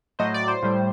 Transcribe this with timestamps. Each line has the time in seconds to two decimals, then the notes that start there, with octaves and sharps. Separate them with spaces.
0.19 A2 F#3 C5 D#5
0.34 D5
0.48 C5
0.63 A2 G3